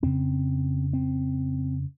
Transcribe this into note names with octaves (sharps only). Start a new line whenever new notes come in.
F2 C#3 C4
C4